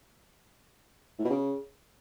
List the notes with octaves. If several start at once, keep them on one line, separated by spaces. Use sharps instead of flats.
A2
B2
C#3